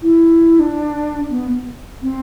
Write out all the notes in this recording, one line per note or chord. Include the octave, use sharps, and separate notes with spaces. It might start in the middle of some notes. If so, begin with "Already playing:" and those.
E4
D4
B3
C4